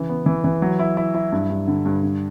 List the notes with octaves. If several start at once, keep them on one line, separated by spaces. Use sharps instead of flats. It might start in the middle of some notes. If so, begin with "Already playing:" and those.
Already playing: C#3 E3
B3
E3
E3
F#3
E4
E4
E4
G2
G2
D3
G2
D3